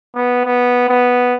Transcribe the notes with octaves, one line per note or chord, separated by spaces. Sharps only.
B3
B3
B3